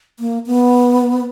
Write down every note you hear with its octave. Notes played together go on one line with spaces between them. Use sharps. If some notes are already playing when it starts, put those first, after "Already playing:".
A#3
B3